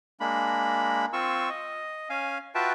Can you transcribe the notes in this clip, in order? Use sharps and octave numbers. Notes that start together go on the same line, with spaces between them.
G#3 A#3 D4 B5
C4 F4 C#6 E6
D#5
C#4 F5 G#5
F4 F#4 B4 E5 G5 A5